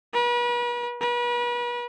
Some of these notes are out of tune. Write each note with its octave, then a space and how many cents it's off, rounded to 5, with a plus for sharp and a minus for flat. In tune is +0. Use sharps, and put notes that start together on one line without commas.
B4 -40
B4 -40